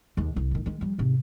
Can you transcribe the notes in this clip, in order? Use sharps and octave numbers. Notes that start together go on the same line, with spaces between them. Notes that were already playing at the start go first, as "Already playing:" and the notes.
D#2 G#3
C2
A2 D#3
D#3 G#3
F3 G3
G#2 C3